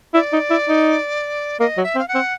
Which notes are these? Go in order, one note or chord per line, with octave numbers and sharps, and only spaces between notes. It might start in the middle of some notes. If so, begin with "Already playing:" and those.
E4 D5
D#4
E4
D#4
A#3 D#5
F#3
E5
C4
F5
F#5
C4